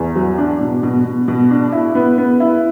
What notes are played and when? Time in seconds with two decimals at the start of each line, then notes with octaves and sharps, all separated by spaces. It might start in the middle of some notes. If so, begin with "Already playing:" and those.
Already playing: E2
0.16 F#3
0.38 D4
0.60 B2
0.83 B2
1.05 B2
1.28 B2
1.50 D4
1.72 E4
1.95 B3
2.18 B3
2.40 E4